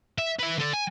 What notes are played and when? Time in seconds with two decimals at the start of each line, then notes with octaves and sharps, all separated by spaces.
0.18 E5
0.39 B4 E5
0.58 D3 A4
0.73 G#5